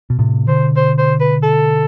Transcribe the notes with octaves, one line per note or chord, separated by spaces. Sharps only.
B2
A2 C3
B2 D3 C5
C5
C5
B4
A4